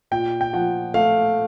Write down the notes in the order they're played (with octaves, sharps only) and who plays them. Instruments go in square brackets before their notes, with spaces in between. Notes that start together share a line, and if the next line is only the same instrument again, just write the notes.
[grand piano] A#2 G5
G5
F3 F#5
A3 F5